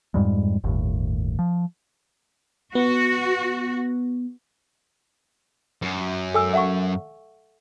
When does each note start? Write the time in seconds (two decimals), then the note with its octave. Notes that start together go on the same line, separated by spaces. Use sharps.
0.14 F2 G#2 G3 G#3
0.64 G1 D#2 A2
1.39 F3
2.75 B3 F#4
5.82 F#2
6.35 A4 G#5 E6
6.53 E5 F#5 C#6